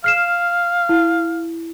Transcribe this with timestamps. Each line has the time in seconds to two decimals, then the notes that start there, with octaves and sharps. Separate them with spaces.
0.04 F5 F6 C7 E7
0.89 E4